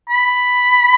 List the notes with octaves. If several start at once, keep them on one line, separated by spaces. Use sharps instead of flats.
B5